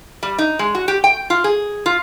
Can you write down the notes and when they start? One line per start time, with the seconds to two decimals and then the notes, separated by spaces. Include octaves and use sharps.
0.23 G3
0.38 D#4
0.59 G#3
0.75 F#4
0.88 G4
1.04 G5
1.30 F4
1.44 G#4
1.86 F4